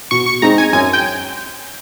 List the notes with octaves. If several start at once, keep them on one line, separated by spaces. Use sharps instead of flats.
B2 C#6
C#6
G#3 C4 D#4 A#5
G#5
F#2 G#5
G5